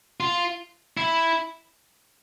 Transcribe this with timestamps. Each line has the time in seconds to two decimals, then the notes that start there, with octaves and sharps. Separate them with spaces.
0.20 F4
0.97 E4